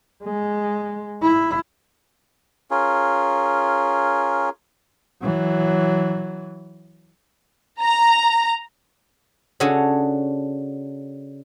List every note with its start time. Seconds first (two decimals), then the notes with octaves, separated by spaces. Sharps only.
0.23 G#3
1.22 E4
2.71 C#4 F4 G#4 A#4
5.22 E3 F#3
7.81 A#5
9.60 C#3 D4 F#4 A4 C#5 G#5